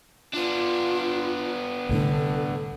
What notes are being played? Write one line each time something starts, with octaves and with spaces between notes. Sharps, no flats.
B3 D4 F4
C2 A2 D3 A4